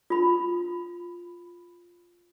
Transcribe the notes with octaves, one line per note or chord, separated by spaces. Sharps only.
F4 B5